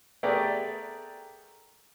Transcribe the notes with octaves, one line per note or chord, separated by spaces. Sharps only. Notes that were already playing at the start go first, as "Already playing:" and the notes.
A3 B3 G4 G#4 A#4 D5